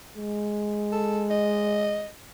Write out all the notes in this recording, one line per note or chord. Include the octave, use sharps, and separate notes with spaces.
G#3
A4
D#5